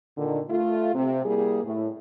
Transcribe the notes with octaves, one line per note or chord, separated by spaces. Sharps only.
A#2 D3 D#3
A3 F4
C3
G3 A#3 E4 G#4
A2